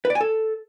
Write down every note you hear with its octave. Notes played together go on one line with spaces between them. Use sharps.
B4
D5
G#5
A4